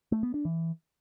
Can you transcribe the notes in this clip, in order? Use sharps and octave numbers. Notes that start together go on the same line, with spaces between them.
A3
B3
D4
E3